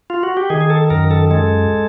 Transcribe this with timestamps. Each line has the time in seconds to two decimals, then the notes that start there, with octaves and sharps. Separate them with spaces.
0.10 F4
0.23 F#4
0.37 G4
0.50 D#3 G#4
0.61 G#4
0.70 A4
0.90 F#2 A#4
1.11 A4
1.31 G#3 A4